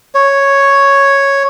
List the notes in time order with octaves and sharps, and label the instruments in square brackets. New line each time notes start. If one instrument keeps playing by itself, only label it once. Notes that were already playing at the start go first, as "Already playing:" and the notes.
[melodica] C#5